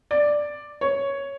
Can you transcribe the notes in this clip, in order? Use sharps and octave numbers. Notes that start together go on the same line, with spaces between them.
D5
C#5